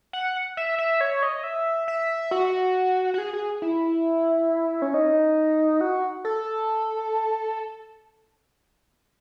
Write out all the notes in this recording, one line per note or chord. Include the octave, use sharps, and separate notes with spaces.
F#5
E5
E5
C#5
D#5
E5
E5
F#4
F#4
G#4
G#4
E4
C#4
D#4
F#4
A4